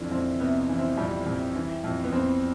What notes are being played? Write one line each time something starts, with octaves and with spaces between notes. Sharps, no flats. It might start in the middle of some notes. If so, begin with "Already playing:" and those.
Already playing: F2 D3 E3 D4
F2 C4
C3 B3
E3
C4
F2 G3 G4
F2
E3
F2
B3
F2 C4